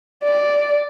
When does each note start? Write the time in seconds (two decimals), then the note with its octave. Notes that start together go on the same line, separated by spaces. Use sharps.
0.24 D5